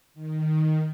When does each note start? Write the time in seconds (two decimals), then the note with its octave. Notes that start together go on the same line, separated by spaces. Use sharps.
0.14 D#3